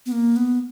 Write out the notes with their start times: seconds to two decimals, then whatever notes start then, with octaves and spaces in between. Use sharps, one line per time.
0.06 B3
0.12 A#3
0.36 B3